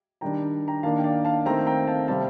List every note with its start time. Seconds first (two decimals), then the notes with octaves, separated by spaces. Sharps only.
0.21 D#3 G3 D4 G5 A#5
0.68 G5 A#5
0.83 D#3 A#3 D4 F5 A5
0.99 G5
1.04 D5 F5
1.25 F5 A5
1.46 D#3 A3 C4 G5 A#5
1.67 G5 A#5
1.87 F5 A5
2.08 C3 G3 C4 F5 A5